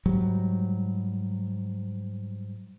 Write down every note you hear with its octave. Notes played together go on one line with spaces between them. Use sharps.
G#2 F#3 G3